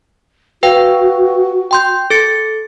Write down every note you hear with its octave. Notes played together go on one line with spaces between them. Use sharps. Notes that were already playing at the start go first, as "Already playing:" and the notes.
F#4 B4 F5 G5
G5 C6 G6
A4 A6 C#7